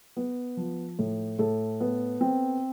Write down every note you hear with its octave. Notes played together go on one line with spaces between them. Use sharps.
B3
F3
A2
A2 A4
B3
C4